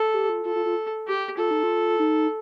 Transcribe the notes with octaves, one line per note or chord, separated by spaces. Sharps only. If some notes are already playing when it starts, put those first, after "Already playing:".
Already playing: A4
G4
F4
F4 A4
F4
F4
G4
F4 A4
D#4
F4
D#4